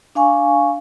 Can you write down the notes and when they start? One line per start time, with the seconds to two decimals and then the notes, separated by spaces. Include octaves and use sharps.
0.15 D4 F5 G#5 C#6